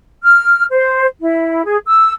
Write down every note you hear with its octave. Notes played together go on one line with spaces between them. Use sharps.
F6
C5
E4
G#4
E6